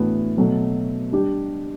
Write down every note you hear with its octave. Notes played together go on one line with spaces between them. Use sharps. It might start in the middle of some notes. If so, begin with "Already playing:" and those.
Already playing: A2 E3 B3 D4 F#4
B2 F#3 A3
G3 D4 G4